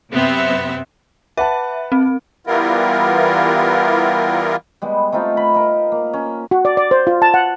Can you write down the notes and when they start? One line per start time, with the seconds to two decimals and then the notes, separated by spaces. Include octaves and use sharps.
0.11 F#2 C3 B3 C4 E5
1.37 B4 E5 F#5 A5
1.92 C4
2.47 E3 G3 B3 E4 F4 A#4
4.82 G3 G#3 B3
5.12 A3 C4 D#4 F4
5.37 B5
5.54 A#4 D#5
5.92 A#3
6.13 C#4
6.51 F#4
6.65 D5
6.77 D5
6.91 C5
7.07 F4
7.22 A5
7.34 F#5